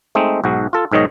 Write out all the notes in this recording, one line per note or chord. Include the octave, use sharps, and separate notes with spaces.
G#3 A3 C4 D#4
B1 G#2 F#4
F4 A4
B1 G#2 D#3 C#5 D#5